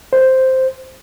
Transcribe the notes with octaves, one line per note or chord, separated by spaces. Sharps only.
C5